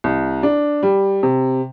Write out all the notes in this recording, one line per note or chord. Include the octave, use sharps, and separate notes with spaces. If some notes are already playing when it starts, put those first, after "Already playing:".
C2
D4
G3
C3